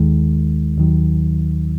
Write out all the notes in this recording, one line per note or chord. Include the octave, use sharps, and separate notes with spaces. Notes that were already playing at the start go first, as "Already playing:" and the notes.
Already playing: D#2 D#3 G#3
D#2 D#3 F#3